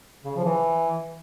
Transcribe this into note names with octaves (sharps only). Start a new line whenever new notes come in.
C#3
F3
E3